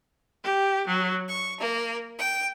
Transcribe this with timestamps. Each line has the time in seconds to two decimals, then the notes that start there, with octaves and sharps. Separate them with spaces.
0.45 G4
0.87 F#3
1.29 C#6
1.60 A#3
2.19 G5